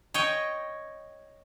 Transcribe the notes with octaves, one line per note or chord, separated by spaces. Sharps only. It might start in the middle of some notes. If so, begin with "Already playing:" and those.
C#5 D#5 G5